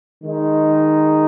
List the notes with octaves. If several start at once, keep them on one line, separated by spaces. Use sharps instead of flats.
D#3 G#3 D#4